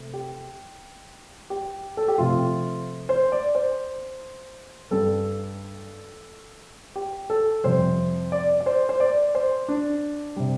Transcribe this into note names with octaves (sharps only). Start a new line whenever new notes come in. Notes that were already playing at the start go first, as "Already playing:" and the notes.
Already playing: C3 A3
G4
G4
A4
G4
C3 F3 A3 F4
C5
D5
C5
G2 G3 A4
G4
A4
F2 C3 G3 C5
D5
D5
C5
C5
D5
C5
D4
C3 G3